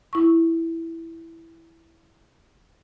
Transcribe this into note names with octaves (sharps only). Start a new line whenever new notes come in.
E4 C#6